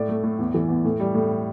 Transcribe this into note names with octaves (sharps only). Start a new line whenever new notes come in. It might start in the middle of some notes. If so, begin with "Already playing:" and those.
Already playing: A2 D5
A3
A2
E2
E3
E2
A2
G3
A2